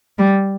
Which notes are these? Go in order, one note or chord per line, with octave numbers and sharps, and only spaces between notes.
G3